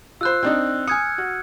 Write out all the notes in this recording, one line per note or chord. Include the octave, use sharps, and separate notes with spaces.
F4 C5 E6 F#6
C4 D4 D#4
G#5 D#6 F6 G#6 C#7
F#4